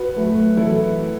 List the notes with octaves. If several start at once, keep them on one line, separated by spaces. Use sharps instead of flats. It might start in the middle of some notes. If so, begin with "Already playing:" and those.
Already playing: F#4 B4
F#3 A3
E3 E4 A4